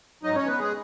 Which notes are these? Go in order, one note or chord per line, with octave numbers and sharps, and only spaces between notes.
G#2 F#3 D#4 D#5
C#4 C#5
B3 B4
G#3 G#4